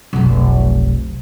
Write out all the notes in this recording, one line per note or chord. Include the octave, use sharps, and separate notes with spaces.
F1 B1